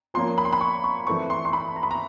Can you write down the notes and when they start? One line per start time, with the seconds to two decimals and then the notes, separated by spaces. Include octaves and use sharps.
0.14 F3 A#3 C#4 C6
0.38 B5
0.45 C6
0.53 B5
0.61 C#6
0.84 C#6
1.07 E3 A3 C4 C#6
1.30 C6
1.45 C6
1.53 B5
1.76 A#5
1.83 B5
1.91 A#5